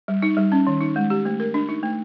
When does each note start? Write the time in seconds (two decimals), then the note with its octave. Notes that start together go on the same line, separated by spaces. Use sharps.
0.08 G3
0.22 D#4
0.37 G3
0.52 C#4
0.67 D#3
0.80 D#4
0.96 G#3
1.10 G4
1.25 A3
1.40 A#4
1.54 D4
1.69 D#4
1.83 A3